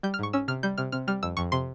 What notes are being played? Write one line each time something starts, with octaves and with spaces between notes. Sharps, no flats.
G3 G6
F6
G#2 C#6
C#4 E6
C3 F6
G3 G6
C3 F6
C3 F6
G3 F6
F2 E6
F2 C#6
C3 C6